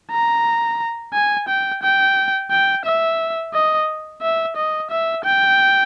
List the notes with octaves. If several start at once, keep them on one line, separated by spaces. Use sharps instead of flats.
A#5
G#5
G5
G5
G5
E5
D#5
E5
D#5
E5
G5